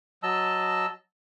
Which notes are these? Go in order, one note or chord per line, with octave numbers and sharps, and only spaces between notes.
F#3 D#5 A5 E6